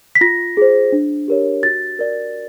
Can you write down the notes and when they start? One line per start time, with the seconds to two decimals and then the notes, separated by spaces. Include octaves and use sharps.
0.15 B6
0.21 F4 A#6
0.57 G#4 C5
0.92 D4
1.28 G4 A#4 C#5
1.63 F#4 A6
1.99 A#4 D5